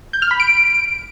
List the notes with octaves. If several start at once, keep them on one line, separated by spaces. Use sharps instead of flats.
G6
F6
B5
D7